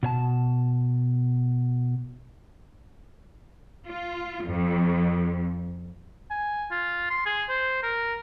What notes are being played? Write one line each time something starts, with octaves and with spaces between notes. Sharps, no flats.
B2 C#5 A5
F4
F2
G#5
F4
C6
G#4
C5
A#4